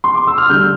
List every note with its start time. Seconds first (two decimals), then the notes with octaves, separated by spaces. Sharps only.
0.04 C6
0.15 D6
0.27 E6
0.38 F6
0.49 D3 G3 D4 G6